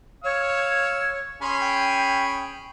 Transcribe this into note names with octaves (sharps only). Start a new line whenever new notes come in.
C#5 F5 E6
C#4 G#4 B5 C6
G5